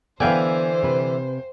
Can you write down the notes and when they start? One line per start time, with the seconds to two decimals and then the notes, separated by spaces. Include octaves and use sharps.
0.20 D3 E3 B3 B4 C5 F5 G5 G#5
0.83 C3 B4